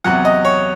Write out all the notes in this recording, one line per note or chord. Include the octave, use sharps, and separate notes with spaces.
E2 C3 F#3 F#5
D#5
C#5